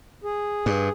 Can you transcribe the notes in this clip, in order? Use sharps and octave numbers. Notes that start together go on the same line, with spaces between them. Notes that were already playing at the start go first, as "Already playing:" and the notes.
G#4
G2